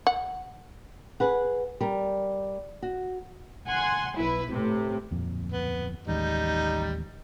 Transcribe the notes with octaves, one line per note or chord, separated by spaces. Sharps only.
F#5
G#4 B4 F#5
G3 A#4
F#4
F#5 G#5 C6
B1 E4 B4
A2 C3
D1 F2 A#2
B3
A1 D#2 G3 G#3 D#4